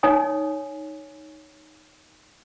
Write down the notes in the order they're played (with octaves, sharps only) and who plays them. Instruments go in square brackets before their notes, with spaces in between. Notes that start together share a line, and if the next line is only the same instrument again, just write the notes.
[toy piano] D#4 C#5 G#5 D#6